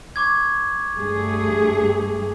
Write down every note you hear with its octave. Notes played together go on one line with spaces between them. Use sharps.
C#6 D6 G#6
G2 A3 G#4